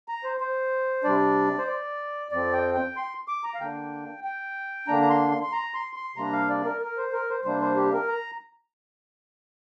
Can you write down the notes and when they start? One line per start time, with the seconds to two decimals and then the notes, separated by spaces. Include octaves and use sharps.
0.08 A#5
0.24 C5
0.40 C5
1.04 C3 G3 D4 D5
1.58 C5
1.67 D5
2.32 F2 F3 C4 D5
2.53 G5
2.75 G5
2.97 C6
3.28 D6
3.44 A#5
3.54 F5
3.60 D3 A#3 D4 G5
4.24 G5
4.88 D3 A#3 D4 A#5
5.02 A#5
5.10 C6
5.31 C6
5.43 C6
5.52 A#5
5.74 C6
5.96 C6
6.16 C3 G3 A#3 D4 A#5
6.32 F5
6.49 D5
6.65 A#4
6.81 A#4
6.97 C5
7.13 A#4
7.29 C5
7.45 C3 G3 A#3 D4 C5
7.62 C5
7.76 G4
7.93 A#4
8.08 A#5